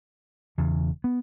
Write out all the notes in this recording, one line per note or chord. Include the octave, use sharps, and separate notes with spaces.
E1 E2 C#3
B3